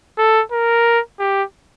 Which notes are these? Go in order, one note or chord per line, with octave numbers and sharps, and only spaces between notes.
A4
A#4
G4